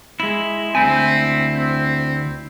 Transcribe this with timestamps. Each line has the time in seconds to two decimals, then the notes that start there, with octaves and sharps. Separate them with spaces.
0.20 G#3 E4
0.75 D2 C4 E4 G#5
1.54 C4